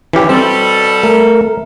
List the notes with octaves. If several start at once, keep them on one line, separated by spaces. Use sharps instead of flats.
D2 D3 E3 C#4 G4
B2 G3 C4 A4
A3 A#4